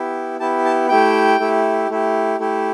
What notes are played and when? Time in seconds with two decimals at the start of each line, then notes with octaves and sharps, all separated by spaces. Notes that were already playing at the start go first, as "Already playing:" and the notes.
Already playing: B3 E4 G4
0.40 B3 E4 G4 A5
0.65 A5
0.89 A3 E4 G4 G5
1.40 A3 E4 G4
1.90 A3 E4 G4
2.39 A3 E4 G4